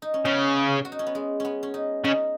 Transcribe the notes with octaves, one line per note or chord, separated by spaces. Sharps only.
D#4
C#4
C#3 B3
F#4
D#4
C#4
B3
G#3
B3 C#4
C#4
D#4
C#3 D#4